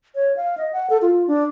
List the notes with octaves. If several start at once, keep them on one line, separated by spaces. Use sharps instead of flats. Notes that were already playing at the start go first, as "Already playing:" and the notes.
C#5
F5
D#5
F#5
A4
F4
D4